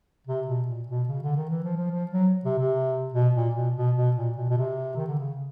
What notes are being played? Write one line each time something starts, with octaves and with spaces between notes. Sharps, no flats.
C3
B2
A#2
B2
C#3
D3
D#3
E3
F3
F3
F3
F#3
C3
C3
B2
A#2
B2
B2
B2
A#2
B2
B2
C3
D#3
D3
C#3